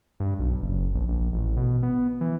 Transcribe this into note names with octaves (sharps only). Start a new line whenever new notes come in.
G2
B1
F#1
A#1
A#1
A1
B2
B3
E3